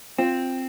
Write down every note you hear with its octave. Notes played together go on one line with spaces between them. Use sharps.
C4 F4